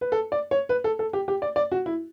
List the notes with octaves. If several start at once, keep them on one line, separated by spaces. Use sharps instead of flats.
B4
A4
D5
C#5
B4
A4
A4
G4
G4
D5
D5
F#4
E4